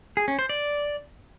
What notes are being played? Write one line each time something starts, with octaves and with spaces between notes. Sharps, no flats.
G#4
C#4
C5
D5